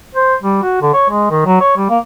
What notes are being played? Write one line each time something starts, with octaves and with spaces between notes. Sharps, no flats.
C5
G3
F#4
D3
C#5
G#3
D#3
F#3
C#5
G3
A#3